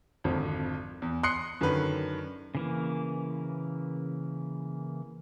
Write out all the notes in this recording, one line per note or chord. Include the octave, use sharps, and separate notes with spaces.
G#1 F2 D3
E2
C6 D#6 F#6 C7 C#7
F#2 D3 D#3 B4
C#3 E3 A#3